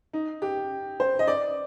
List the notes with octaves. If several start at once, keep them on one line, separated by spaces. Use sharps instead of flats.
D#4
G4
C5
D#5
D5